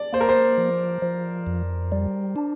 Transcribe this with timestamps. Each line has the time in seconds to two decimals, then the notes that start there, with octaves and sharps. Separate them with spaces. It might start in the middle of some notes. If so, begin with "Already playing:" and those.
Already playing: D5
0.13 A#3 C5
0.20 A#4
0.29 C5
0.58 F3
1.02 F3
1.47 F2
1.92 G3
2.36 D4